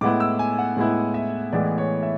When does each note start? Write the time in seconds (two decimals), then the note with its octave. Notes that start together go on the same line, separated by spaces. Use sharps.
0.01 A2 G#3 B3 E4 D6
0.20 E6
0.39 G#5
0.59 F#5
0.77 A2 G#3 B3 E4
1.14 E5
1.53 A2 E3 G#3 B3 D5
1.78 C#5
2.03 E5